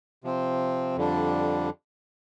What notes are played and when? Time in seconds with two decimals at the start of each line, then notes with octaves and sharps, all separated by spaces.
0.24 C3 F3 C4
0.96 F2 D3 G3 D4